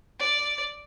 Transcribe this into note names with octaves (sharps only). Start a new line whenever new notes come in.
D5